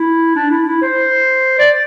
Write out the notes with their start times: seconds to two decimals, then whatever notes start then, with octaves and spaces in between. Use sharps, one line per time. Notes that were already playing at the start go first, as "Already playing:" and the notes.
Already playing: E4
0.36 D4
0.50 E4
0.67 E4
0.82 C5
1.59 D5